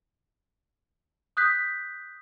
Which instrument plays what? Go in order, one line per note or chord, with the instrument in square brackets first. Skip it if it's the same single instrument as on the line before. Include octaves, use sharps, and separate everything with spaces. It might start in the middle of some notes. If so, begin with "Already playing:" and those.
[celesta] D#6 F#6 G6 B6